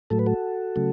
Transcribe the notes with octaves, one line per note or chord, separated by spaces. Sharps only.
A2 F#3 A3 A4
B4
F#4 A4
C#3 F#3 A3